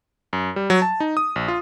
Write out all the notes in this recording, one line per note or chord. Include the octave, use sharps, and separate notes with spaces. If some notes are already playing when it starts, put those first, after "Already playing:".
F#2
G3
F#3
A5
D#4
D#6
A#1
F4